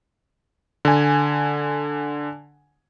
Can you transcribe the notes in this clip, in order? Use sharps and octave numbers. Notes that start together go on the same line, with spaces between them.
D3 G#5